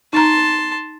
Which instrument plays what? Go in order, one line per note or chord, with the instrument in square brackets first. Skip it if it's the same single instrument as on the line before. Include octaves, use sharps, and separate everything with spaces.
[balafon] D#4 A#5 [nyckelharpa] A5 C6